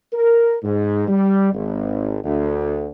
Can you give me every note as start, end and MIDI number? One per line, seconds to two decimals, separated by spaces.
0.12 0.57 70
0.63 1.04 44
1.08 1.49 55
1.53 2.19 32
2.24 2.91 38